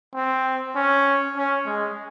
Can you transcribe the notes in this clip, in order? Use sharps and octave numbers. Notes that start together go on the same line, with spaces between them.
C4
C#4
C#4
G#3